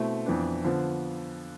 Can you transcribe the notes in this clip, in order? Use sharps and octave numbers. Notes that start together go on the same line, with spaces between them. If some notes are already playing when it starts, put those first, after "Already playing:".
Already playing: B2 A3 C4 E4
F2 E3 B3 D4
D3 F3 B3